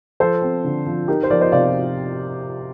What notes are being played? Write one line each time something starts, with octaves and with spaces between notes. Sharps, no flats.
F3 A4 C5
C4
D3
F3
D#4 G4 A#4
C5
F3 A#4 D5
C5 D#5
C3 D5 F5